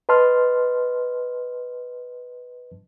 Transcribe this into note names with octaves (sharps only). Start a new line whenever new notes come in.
B4 D#5 A5 C6 F6